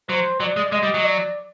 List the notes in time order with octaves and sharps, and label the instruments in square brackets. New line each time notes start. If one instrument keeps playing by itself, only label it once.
[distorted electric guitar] F#3 [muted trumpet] C5
[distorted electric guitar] F#3 [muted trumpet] D5
[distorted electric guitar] G#3
[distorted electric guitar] G#3 [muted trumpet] D#5
[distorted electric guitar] G3
F#3
[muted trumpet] D5